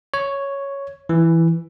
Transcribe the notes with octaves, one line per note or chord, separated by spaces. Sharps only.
C#5
E3